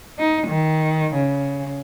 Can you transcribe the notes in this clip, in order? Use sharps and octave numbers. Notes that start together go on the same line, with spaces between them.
D#4
D#3
C#3